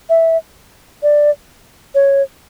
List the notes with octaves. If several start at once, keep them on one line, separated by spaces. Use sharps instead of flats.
E5
D5
C#5